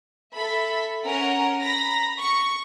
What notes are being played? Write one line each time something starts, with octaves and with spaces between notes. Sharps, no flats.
A4 E5 B5
C#4 A#4 F#5 A#5
A#5 B5 A#6
C#6